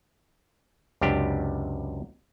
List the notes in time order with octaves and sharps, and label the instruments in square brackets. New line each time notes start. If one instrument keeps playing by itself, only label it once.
[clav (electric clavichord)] C#2 F#2 C3 D4 G4